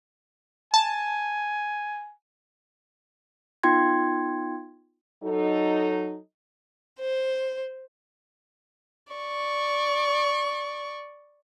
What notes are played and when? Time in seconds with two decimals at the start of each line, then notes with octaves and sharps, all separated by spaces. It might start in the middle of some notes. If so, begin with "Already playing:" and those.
0.74 G#5 A5
3.63 B3 D#4 F4 G5 C6 G#6
5.23 F#3 D#4 A4
6.99 C5
9.13 D5 C#6